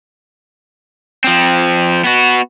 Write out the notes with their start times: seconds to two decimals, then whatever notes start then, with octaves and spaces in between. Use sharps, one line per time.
1.24 F3 C4
2.04 B3 F#4